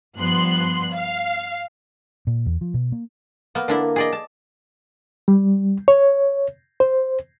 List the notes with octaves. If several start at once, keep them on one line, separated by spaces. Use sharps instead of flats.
G2 F3 B3 C6 F#6
F5
A#2
E2
F3
B2
A#3
A#3 B3
D3 A#3 D4 E4
A#3
G#4 D5 D#5
A5
G3
C#5
C5